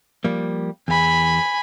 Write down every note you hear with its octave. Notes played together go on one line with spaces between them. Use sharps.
F3 G3 A#3
E2 G#5 B5